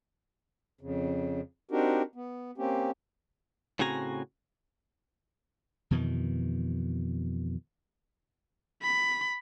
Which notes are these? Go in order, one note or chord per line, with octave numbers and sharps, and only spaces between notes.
F2 C#3
C4 D4 D#4 F#4 G4 A#4
B3
A#3 C4 C#4 G4
A2 C#3 C4 F#4 G#5 A#5
F2 B2 D#3 E3
B5